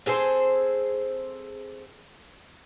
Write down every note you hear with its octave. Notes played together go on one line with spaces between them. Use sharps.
C4 G#4 A4 C5